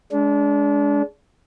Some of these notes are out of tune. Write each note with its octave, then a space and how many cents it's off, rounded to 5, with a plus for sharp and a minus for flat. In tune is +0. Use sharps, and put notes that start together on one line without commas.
G#3 +10 D4 -30